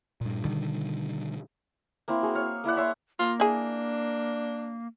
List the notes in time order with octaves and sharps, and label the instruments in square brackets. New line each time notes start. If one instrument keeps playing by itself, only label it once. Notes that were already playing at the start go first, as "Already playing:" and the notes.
[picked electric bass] G2 A#2
B2 D3 D#3 G3
[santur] A#3 C4 E4
F#4 G#4
C#5 F5
A#3 E4 D5 F#5
C#5 E5 C6
[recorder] A#3 [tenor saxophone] F4
[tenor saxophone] D4 [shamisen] E4 G#4